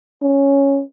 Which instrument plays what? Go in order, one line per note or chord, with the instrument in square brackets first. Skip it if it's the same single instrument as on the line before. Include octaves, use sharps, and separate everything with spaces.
[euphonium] C#4